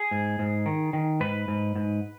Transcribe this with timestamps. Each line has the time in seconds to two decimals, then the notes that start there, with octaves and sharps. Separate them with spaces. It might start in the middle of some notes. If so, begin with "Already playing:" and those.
Already playing: G#4
0.11 G#2
0.39 G#2
0.66 D#3
0.93 D#3
1.20 G#2 B4
1.48 G#2
1.75 G#2